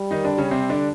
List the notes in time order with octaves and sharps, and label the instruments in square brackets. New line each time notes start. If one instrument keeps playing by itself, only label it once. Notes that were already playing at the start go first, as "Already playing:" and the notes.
Already playing: [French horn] G3
[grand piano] D#3 D#4
D3 D4
C#3 C#4
C3 C4
D3 D4